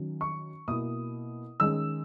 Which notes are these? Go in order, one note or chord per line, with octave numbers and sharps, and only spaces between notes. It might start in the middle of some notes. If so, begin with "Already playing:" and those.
Already playing: D#3 F#3 C#4
C#6
B2 A#3 E4 D#6
D#3 G#3 C#4 E6